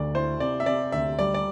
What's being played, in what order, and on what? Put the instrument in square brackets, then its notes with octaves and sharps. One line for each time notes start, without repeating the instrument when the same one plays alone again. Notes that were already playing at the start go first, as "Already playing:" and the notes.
Already playing: [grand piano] D2 [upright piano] D5
[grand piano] E4 [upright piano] C5
[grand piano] C3 [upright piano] D5
[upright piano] E5
[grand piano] C3 [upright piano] D5
[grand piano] D2 [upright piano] E5
[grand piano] G3 [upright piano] D5
[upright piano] D5